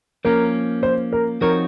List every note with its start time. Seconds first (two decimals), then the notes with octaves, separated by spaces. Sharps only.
0.25 F3 A#3 C#4 A#4
0.83 C5
1.12 A#4
1.41 F3 C4 D#4 F#4 A#4 C#5